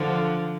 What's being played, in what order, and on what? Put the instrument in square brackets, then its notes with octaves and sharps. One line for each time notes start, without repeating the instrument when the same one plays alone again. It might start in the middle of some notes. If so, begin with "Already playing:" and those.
Already playing: [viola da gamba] D3 F3